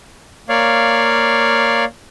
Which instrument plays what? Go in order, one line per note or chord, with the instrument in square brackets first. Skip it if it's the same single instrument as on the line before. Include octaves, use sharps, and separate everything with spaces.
[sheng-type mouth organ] A#3 C#5 D5 F5